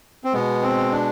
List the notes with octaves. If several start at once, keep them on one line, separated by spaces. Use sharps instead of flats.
C4
B2 G#3 B3
C4
D4